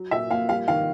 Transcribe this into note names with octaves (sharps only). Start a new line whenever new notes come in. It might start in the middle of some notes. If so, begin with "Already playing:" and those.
Already playing: F#3
A#2 E5
A#2 F5
G3 F5
D#3 F5